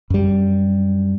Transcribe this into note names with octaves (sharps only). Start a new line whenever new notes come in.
F#2 G3